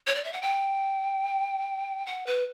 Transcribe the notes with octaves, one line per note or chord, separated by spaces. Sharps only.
C#5
D5
E5
F#5
G5
F#5
B4